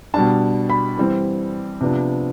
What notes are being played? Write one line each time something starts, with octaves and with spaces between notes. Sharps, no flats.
B2 G3 D4 A5
B5
E3 G3 C4
C3 F3 B3 D4